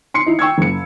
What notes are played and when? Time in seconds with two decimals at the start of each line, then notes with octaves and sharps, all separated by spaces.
0.14 C6 C7 C#7
0.26 D#4 E4
0.39 G5 C#6 E6 G#6
0.58 F#1 C#7